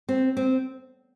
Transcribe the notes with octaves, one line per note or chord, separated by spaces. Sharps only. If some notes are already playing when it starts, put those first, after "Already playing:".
C4
C4